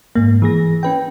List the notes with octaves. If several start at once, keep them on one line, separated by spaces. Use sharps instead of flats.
G#2 A#3
E3 G#4 A#6
C#4 B4 G5